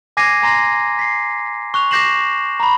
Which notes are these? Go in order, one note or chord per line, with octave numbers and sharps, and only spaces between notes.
G#5 D6 G#6 A#6 C7 D#7
G#5 A#5 C6 A#6 C7
B6 C7
C#6 F#6 F7
D6 G6 A#6 C7 E7 F#7
A#5 B5